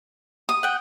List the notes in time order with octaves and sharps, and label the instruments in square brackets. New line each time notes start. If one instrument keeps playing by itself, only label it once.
[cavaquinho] D#6
[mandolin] F#5 G5